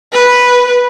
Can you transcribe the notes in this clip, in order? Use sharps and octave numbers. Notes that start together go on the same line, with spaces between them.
B4